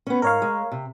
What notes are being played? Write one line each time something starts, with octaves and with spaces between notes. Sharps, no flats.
B3 C#4
G#2 A#4 C#5 F5
G#3
C3